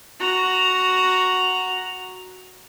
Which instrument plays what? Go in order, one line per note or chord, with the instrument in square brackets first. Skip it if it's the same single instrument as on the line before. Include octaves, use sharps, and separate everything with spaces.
[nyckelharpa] F#4 A#5